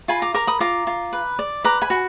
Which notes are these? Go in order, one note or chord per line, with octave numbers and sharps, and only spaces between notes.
F4 G#5 B5
A#5 D6
A#4 A#5 D6
B5 D#6
F4 A#5 D6
F4
B4
D5
B4 A#5 D6
G#5 B5
F#4